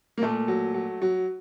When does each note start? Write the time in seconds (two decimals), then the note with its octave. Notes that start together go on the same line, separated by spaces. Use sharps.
0.18 A#3
0.22 A#2 A3
0.48 F#3
0.74 F#3
1.02 F#3